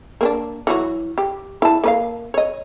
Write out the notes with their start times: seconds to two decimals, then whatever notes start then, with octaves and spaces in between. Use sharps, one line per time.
0.21 A#3 C4 D4
0.67 E3 F#3 F#4
1.18 G4
1.62 E4 A5
1.84 A#3 B4 F5
2.34 C#5 D#5